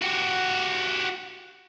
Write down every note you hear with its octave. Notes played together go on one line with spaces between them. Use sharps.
F#4 G4